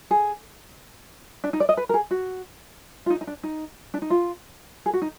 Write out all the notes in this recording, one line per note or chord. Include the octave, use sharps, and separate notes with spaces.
G#4
D4
D#4
D5
D#5
B4
A#4
G#4
F#4
F4
D#4
D#4
D4
D#4
D4
D#4
F4
G#4
F#4
D#4